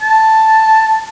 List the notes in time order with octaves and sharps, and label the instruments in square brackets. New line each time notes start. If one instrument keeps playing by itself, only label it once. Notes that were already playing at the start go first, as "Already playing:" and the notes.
[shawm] A5